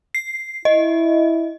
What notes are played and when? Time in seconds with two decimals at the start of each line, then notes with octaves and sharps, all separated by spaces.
0.15 C7
0.65 E4 D#5